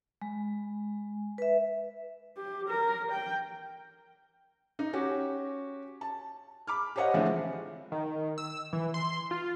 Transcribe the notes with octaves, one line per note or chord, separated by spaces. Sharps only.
G#3
B4 E5
G4
A#4
G5
D#4
C#4 F#4 G4
A5
B5 D6 F6
G4 C5 C#5 D#5 F#5
D3 F3 G#3 A3 C4 E4
D#3
E6
E3
C6
F4